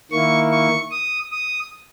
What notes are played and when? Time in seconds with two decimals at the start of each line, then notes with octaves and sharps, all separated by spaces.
0.11 D#3 A#3 E4 C#6
0.51 C#6
0.91 D#6
1.31 D#6